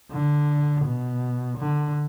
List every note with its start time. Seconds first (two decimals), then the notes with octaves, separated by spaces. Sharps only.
0.12 D3
0.85 B2
1.58 D3